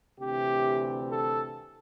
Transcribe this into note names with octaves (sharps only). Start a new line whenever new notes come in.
D2 C3 E3 G4
A4